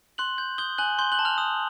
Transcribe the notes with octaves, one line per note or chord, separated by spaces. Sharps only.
C6 F#6 F#7
G6
D#6 G6 G7
G#5 F#6 F#7
C6 G6 G7
F#6 F#7
A5
F6 F7
D#6